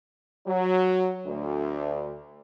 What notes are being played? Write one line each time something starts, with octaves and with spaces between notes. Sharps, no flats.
F#3
D2